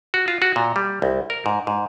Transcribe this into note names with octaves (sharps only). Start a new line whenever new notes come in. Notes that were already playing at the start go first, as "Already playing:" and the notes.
F#4
F4
F#4
A#2
G3
C2
A#4
G#2
G#2